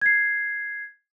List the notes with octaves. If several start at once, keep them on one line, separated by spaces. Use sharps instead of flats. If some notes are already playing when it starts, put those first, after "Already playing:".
G#6 C7